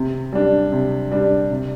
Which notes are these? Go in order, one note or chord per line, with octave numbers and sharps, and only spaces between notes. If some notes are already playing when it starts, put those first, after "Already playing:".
Already playing: C3
G3 D4
C3
G3 D4
C3